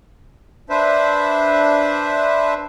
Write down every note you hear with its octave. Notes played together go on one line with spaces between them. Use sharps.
D4 B4 C5 E5